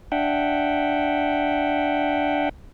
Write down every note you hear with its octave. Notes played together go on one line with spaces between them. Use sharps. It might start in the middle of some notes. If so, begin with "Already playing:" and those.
D4 E5 F#5 G5